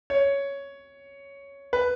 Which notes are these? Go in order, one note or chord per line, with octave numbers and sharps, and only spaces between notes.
C#5
B4